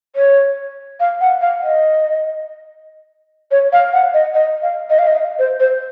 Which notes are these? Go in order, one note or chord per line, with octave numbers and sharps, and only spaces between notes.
C#5
F5
F#5
F5
D#5
C#5
F5
F#5
D#5
D#5
F5
D#5
F5
D#5
C5
C5